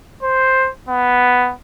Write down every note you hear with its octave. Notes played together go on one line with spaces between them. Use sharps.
C5
B3